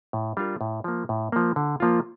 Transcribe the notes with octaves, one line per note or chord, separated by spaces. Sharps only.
A2
G3 D4 F4 A#4
A2
F3 A#3
A2
F3 A#3
D3
F3 A#3 F4